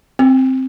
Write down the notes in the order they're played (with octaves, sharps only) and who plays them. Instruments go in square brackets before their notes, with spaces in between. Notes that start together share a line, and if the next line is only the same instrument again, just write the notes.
[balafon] C4